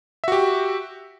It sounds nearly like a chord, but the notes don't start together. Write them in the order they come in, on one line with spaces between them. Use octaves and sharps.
E5 F#4 G4